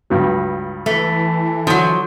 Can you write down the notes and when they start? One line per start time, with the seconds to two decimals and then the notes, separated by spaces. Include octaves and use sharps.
0.10 C#2 G2 F#3
0.86 E3 A3
1.67 D3 F3 F#3